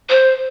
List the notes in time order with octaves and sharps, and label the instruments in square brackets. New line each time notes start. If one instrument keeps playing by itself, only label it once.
[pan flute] C5